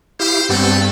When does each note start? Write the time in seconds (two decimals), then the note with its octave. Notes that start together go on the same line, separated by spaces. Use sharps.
0.20 E4 G4 C5 F5
0.50 G2 B3 C4 G4 A4